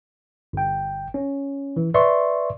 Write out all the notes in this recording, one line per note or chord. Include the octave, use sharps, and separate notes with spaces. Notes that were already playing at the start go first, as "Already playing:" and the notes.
G1 G5
C#4
E3
B4 D5 E5 C6 C#6